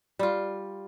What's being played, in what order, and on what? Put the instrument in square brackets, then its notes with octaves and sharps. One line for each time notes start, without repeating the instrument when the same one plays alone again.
[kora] G3 F4